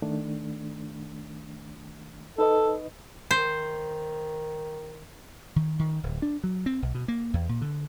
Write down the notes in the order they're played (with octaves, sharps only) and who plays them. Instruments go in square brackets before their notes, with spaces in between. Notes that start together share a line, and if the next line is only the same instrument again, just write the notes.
[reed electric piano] D#3 A3 D4
[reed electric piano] D#4 B4 D#5 [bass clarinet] A4
[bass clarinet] D#3 [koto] C5
[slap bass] D#3
D#3
D1
D4
F#3
C4
B1
B2
A#3
E2
A#2
D3